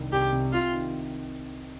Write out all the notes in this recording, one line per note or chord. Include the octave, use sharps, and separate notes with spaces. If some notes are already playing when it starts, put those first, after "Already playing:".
Already playing: C2 D#3 D4
C2 G4
C3
C3 F4
D#3